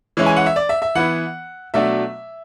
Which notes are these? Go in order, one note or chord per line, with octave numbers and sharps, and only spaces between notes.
E3 G#3 C#4 E4
G#5
F#5
E5
D5
E5
E5
E3 B3 E4 F#5
B2 F#3 A3 D4 E5